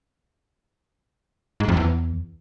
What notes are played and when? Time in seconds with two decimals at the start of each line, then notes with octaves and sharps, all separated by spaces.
1.60 G#2
1.68 F2
1.77 E2